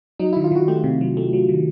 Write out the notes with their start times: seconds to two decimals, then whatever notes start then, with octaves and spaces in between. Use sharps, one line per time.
0.19 F#3 D#4
0.33 D#3 E4
0.44 F4
0.52 D#3 F#4
0.68 A3 G4
0.84 C3
1.01 F#3
1.17 A3
1.33 F#3
1.49 D#3